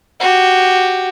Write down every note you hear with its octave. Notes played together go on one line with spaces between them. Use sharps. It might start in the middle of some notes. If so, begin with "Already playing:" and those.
F#4 G4